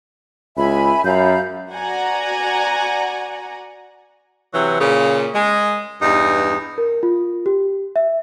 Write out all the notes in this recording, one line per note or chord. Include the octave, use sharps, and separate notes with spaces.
C#2 E5 G#5 B5
F#2 F5 B5 G6
F#4 D5 F#5 G#5 A#5
C3 E3 F#3
A#2 C#3
G#3
E2 G2 D#4
A#4
F4
G4
E5